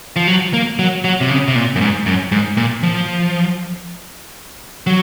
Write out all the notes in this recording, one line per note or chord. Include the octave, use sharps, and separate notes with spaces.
F3
F#3
A#3
F#3
F#3
C3
C#3
C3
A#2
F#2
G#2
F#2
G#2
A#2
F3
F#3